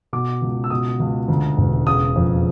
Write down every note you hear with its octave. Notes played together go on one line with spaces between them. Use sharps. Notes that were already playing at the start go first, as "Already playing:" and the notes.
B2 D6
C#2
E6
B2 D#6
C#2
D2
E1
C#3 D#6
F2